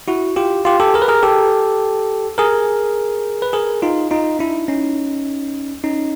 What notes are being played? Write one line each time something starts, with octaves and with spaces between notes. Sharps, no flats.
E4 F#4
F4 G4
F4 G4
G4 A4
G#4 A#4
B4
G#4 A#4
G4 A4
G#4 A#4
B4
G#4 A#4
D#4 F4
D#4 F4
D4 E4
C#4 D#4
C#4 D#4